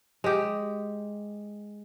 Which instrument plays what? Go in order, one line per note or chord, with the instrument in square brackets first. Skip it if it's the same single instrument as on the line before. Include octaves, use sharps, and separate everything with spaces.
[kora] G#3 G4